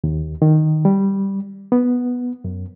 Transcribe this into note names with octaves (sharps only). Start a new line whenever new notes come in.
D#2
D#3
G3
B3
F#2